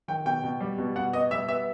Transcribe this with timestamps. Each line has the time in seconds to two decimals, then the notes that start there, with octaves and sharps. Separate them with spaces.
0.08 D#3 G5
0.25 B2 G5
0.43 B2
0.60 G3
0.78 B2
0.96 B2 F#5
1.13 B3 D#5
1.31 G3 E5
1.48 B3 E5